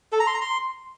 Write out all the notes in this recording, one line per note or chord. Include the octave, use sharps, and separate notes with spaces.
A4
A#5
C6
A#5
C6